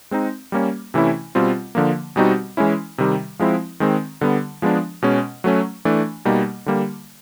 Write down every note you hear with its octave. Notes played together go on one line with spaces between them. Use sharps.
G#3 C4 D#4
G3 A#3 C#4
C3 E3 A3 C#4 E4
B2 G3 C4 F4
D3 F3 A#3
B2 G3 C4 D#4 F#4
E3 G#3 C#4 E4
C3 D#3 G3
F3 G#3 C4 E4
D#3 G#3 C4
D3 G3 B3
F3 G#3 B3 D4
B2 G#3 C#4
F#3 A3 C#4
E3 A3 D4
B2 G3 A#3 D#4
D3 G3 A#3